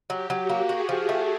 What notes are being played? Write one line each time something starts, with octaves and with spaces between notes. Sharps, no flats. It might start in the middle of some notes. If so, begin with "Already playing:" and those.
F#3 G4
F#3
F#4
A#3
F#4 G#4
F3
A3